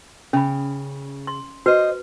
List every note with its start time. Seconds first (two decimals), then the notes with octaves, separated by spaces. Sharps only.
0.33 C#3 C#4 B5
1.27 C6
1.66 F#4 B4 C5 D#5